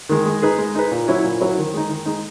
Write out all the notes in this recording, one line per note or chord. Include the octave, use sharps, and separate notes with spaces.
D#3 G#3
G#3
D#4 G#4 B4
G#3
D#4 G#4 B4
A#2
F#3 C#4 E4
A#2
F#3 C#4 E4
D#3
G#3 D#4
D#3
G#3 D#4